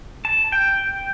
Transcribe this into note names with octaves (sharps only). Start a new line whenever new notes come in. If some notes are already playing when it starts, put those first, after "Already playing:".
A5
G5